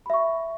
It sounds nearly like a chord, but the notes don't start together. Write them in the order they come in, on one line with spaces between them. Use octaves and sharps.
B5 E5 C#6